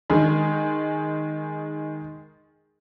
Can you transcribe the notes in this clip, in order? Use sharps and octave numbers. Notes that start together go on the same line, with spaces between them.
D#3 G#3